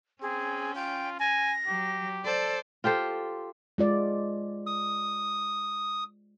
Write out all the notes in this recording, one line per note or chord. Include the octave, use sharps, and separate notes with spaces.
C4 C#4 G#4
F4 G5
G#5 A#6
F#3 G4
A4 C5 D5
F4 G4 A4 C5
G#3 F4 D5
D#6